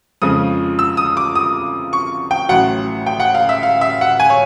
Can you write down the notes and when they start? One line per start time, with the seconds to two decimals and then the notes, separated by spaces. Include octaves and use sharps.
0.22 F2 C#3 F3 G#3 D#6
0.79 E6
0.97 D#6
1.17 D6
1.35 D#6
1.93 C#6
2.31 G5
2.49 A1 A2 F#3 F#5
3.06 G5
3.20 F#5
3.35 F5
3.49 E5
3.63 F5
3.81 E5
4.01 F#5
4.20 G#5
4.30 C#5